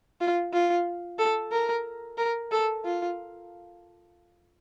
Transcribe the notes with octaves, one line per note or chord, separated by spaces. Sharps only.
F4
F4
A4
A#4
A#4
A4
F4